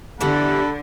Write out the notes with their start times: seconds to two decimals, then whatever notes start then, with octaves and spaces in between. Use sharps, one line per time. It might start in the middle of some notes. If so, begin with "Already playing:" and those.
0.21 D3 E3 G3 B3 A4 F#5 B5